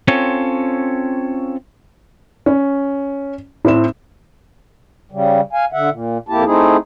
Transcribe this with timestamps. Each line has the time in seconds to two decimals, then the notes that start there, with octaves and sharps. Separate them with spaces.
0.08 C4 C#4 F4 A4 C#5
2.46 C#4
3.65 A2 C4 C5 E7
5.12 C#3 G3
5.53 F5 G#5
5.73 D3 E5 F#5
5.90 A#2
6.29 F2 A#3 E4 G4 A5
6.45 A3 C4 D#4 E4 G#4